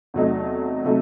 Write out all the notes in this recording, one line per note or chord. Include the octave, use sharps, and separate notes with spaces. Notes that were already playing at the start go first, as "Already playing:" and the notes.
E2 C3 F#3 A3 D#4
C3 F#3 A3 D#4